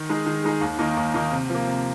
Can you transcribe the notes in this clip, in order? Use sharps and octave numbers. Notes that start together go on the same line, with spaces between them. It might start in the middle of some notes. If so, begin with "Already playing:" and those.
Already playing: D#3
G#3 D#4 G#4
D#3
G#3 D#4 G#4
D#2
D#3 A#3 D#4
D#2
D#3 A#3 D#4
C3
F3 A#3
C3